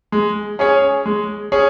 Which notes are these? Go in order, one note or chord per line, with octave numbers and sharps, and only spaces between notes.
G#3
C#4 G#4 C#5
G#3
C#4 G#4 C#5